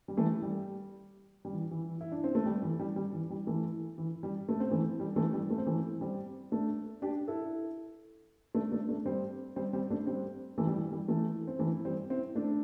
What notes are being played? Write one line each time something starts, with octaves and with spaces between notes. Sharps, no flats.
G3
E3 A3
G3
G3
E3
E3
E4
D4
C4
A3
G3
E3
G3
G3
E3
G3
E3 A3
E3
G3
A3
C4
E3 A3
G3
E3 A3
G3
A3
C4
E3 A3
G3 C4
A3 D4
D4 G4
E4 A4
A3 D4
A3 D4
A3 D4
G3 C4
G3 C4
G3 C4
A3 D4
G3 C4
E3 A3
G3
E3
G3
E3 A3
C4
E3 A3
G3 C4
C4 E4
A3 D4